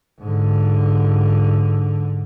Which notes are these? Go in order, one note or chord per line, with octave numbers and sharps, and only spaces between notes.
G#2 D3